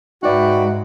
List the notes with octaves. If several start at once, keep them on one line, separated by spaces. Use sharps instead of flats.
G#2 D#4 F#4 B4 D5 E5 G5